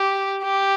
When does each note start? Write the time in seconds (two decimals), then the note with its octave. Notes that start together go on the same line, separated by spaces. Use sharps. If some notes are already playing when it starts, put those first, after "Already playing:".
Already playing: G4
0.43 G4